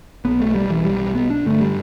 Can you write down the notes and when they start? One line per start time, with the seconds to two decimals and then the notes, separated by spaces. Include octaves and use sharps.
0.25 B1 B2 B3
0.40 A3
0.55 G3
0.70 E3
0.85 G3
1.15 B3
1.30 D4
1.45 G1 G2 D3 A3
1.61 G3